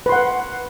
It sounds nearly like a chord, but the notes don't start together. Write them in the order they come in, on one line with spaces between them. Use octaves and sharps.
B4 C6 F#5